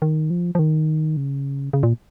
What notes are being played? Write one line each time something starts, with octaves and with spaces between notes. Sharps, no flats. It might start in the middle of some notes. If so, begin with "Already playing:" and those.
D#3
F3
F3
D#3
C#3
C#3
A#2